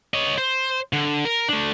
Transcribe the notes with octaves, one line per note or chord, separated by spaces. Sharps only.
C#5 D#5
C5
D3
A#4
A3 D4